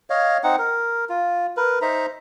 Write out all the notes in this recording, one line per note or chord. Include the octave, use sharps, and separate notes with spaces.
C#5 D#5 F5
C4 D#4 F#5
A#4
F4
A#4 B4
D#4 C5 E5 A#5